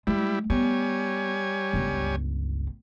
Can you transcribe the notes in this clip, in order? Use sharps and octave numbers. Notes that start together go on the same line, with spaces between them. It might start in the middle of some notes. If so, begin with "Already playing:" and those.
G3 G#3 E4
G3 B3 C#5 G#5
G1 C#2